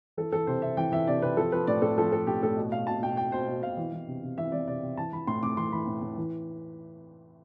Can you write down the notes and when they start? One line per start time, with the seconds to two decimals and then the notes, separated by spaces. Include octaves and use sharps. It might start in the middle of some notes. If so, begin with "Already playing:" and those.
0.17 E3 A4
0.32 E3 A4
0.47 C3 C5
0.62 C3 E5
0.77 E3 G5
0.92 E3 E5
1.07 C3 D5
1.22 C3 B4
1.37 F3 A4
1.52 F3 B4
1.67 A2 D5
1.82 A2 A4
1.98 F3 A4
2.12 F3 A4
2.27 A2 G4
2.43 A2 A4
2.57 B2
2.72 B2 F5
2.87 B2 A5
3.02 B2 G5
3.17 B2 G5
3.32 B2 C5
3.48 B2
3.62 B2 F5
3.77 E3
3.92 E3
4.08 C3
4.23 C3
4.38 E3 E5
4.52 E3 D5
4.68 C3 D5
4.82 C3
4.97 E3 A5
5.13 E3 B5
5.27 A2 C6
5.42 A2 D6
5.57 E3 C6
5.72 E3 B5
5.87 A2
6.02 A2
6.17 E3